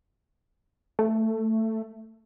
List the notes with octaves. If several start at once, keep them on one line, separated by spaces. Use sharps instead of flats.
A3